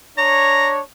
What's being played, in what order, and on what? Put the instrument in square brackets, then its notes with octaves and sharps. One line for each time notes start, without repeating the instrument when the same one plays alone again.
[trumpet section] D4 C#5 [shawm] A#5